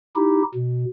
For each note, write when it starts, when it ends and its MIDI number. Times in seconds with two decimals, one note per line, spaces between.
0.16 0.43 63
0.16 0.43 64
0.16 0.43 67
0.55 0.85 47